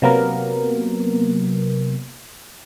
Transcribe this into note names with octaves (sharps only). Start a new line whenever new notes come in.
C3 F#3 A#3 B3 A#4